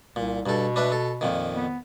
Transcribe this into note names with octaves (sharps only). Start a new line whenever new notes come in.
C2 A#2
G2 B2 A4
D4 B4 E5
A4
F2 A#2 D#3
B3